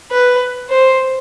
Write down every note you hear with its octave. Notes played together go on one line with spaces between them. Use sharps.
B4
C5